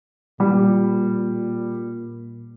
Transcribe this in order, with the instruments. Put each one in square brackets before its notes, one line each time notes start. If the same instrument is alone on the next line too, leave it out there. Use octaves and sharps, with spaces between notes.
[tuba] A#2 [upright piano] G3